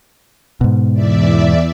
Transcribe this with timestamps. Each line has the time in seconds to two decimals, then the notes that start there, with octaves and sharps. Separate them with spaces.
0.61 G#2 B2
0.93 E2 D5 E5